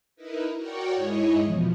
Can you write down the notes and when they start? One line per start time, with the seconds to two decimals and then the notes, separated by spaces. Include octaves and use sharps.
0.16 D#4 E4 A#4 B4
0.55 F#4 A#4 C#5 D5 F#5 G5
0.93 G#2 E4 G#4 C#5 D#5
1.40 E2 B2 F3